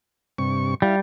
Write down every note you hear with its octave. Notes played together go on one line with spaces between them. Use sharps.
G2 C3 C#6
G3 E4 F5